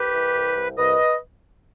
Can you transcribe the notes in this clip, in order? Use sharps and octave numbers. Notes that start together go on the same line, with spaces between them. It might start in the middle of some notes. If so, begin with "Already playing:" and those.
Already playing: C2 G4 B4
E3
C2
C2
C2 B4 D#5